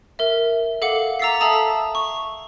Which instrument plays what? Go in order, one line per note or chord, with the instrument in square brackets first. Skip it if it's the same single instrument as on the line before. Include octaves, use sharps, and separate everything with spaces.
[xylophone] A#4 E5
A4 F5 F#5 D6 C#7
A#5 D6 E6 A6 B6 C7
A4 E5 A5 A#5 D#6
C#6